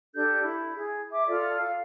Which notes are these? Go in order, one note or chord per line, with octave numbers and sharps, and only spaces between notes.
D4 G4 A4 G6
E4
G#4
E5 D6
F4 A4 D5
F5